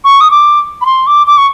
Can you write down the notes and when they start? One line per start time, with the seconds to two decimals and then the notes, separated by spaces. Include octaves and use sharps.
0.04 C#6
0.21 D#6
0.31 D6
0.81 B5
0.86 C6
1.07 D6
1.27 D6
1.38 C#6